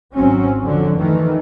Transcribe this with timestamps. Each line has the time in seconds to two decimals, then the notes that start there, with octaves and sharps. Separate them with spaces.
0.15 G#1 F#3 C4 C#4
0.63 F2 D3 F#3
0.96 D#3 E3 A3